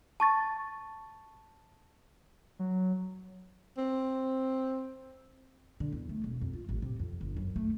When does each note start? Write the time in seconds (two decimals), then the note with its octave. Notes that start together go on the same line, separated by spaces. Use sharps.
0.20 A5 C#6 A6
2.59 F#3
3.78 C4
5.80 D3
5.92 E2
6.09 A3
6.24 E1
6.41 F2
6.53 F4
6.69 A1
6.82 C3
6.99 F2
7.21 G1
7.37 F#2
7.56 A3